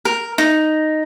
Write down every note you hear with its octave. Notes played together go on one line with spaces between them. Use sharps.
A#4
D#4